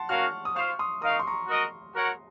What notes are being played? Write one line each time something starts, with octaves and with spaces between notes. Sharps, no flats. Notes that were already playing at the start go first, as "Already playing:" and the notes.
Already playing: F#5 A5 C6
C#4 F#4 A#4 F5 C#6 F6
D#6
F4 C5 F5 C#6 F6
C6 D#6
D#4 A#4 F5 D#6
C#6
C6
A#5 C#6
F#4 A#4 D#5
F#4 A#4 C#5 F#5